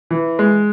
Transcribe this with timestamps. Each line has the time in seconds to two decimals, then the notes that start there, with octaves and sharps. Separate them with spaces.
0.11 E3
0.39 G#3